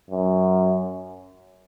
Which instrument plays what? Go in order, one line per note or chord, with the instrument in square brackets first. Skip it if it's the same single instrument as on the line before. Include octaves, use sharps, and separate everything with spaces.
[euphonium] F#2